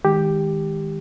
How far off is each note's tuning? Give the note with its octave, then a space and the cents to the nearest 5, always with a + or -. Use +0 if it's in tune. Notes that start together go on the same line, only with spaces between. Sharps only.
D#3 +25 G#3 +0 G4 +0